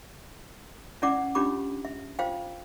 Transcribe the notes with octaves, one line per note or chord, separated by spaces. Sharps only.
C#4 E4 D5 F#5 D6
C#4 D4 F4 G4 B5 D6
E5
F4 C5 F5 G5